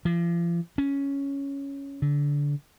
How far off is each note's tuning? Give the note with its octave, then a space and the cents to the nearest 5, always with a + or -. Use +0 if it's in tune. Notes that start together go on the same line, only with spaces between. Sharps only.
F3 -40
C#4 +5
D3 -20